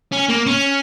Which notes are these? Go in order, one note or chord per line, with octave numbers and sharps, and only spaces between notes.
C#4
A#3
C#4